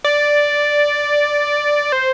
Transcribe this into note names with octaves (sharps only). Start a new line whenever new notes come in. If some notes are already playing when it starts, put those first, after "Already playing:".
D5
C5